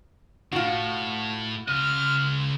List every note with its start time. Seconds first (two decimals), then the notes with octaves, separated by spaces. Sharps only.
0.53 A2 F4 F#4
1.68 C#3 D#5 F6